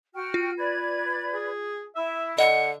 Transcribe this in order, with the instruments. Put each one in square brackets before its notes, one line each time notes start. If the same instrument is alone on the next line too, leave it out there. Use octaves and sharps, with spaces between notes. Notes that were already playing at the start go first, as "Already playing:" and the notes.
[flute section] F#4 G5 F6
[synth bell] F4
[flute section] B4 D5 G#6
[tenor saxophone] G#4
[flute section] E4 [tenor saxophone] E5
[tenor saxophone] D3 [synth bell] D#5 [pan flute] F#5